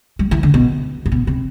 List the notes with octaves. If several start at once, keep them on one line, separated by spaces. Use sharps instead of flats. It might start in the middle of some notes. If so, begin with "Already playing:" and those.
G3
E3
D3
B2
A2
B2
C3